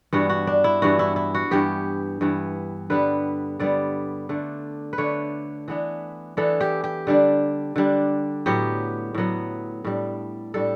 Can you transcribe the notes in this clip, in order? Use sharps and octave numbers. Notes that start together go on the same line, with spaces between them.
G2 E3 B3 D4 F#4
F#4
D4
E4
G2 E3 B3 D4 F#4
E4
E4
F#4
G2 E3 B3 G4
G2 E3 B3
D3 G3 B3 B4
D3 G3 B3 D5
D3 A3 D4
B4
D3 A3 D4 C#5
E3 B3 D4
E3 B3 D4 A4
G4
G4
D3 G3 D4
D3 G3 D4
A2 F#3 B3 G4
A2 F#3 B3
A2 G3 D4
A2 G3 D4 A4